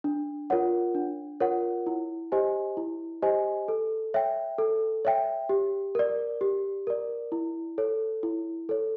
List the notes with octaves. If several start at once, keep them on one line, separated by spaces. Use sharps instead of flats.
D4
F4 A#4 C#5 F#5
D4
F4 A#4 C#5 F#5
E4
G4 C5 D#5 G#5
E4
G4 C5 D#5 G#5
A4
C#5 E5 G5
A4
C#5 E5 G5
G4
A#4 D5
G4
A#4 D5
E4
A4 C#5
E4
A4 C#5